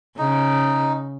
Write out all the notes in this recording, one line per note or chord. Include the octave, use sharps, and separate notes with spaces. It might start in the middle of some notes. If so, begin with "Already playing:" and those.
C#3 D#4